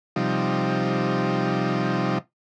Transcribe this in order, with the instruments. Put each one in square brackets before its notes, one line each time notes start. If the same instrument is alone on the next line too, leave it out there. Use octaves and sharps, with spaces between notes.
[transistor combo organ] C3 F3 G3 D#4